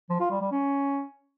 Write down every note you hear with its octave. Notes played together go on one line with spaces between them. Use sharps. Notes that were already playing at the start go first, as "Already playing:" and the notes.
F3
F4
G3
G3
C#4